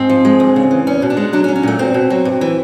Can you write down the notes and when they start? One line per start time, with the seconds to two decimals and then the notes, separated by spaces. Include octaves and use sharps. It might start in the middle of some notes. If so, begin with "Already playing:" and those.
Already playing: G#2 C4
0.09 F3
0.25 G#3
0.40 D2
0.56 C#3
0.71 E3
0.87 E2 C#4
1.02 B2
1.10 D4
1.17 G#3
1.33 F#3 D4
1.44 C#4
1.48 F#3
1.56 C#4
1.63 A#2 A3
1.79 E2 C4
1.94 B2
2.10 F#3
2.25 G2
2.41 E3